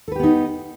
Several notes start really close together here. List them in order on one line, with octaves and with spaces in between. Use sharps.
A4 B4 G4 B3 D#4